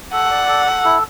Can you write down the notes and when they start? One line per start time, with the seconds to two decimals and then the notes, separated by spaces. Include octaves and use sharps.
0.13 A4 F#5
0.31 D5
0.48 A4
0.66 A4
0.84 E4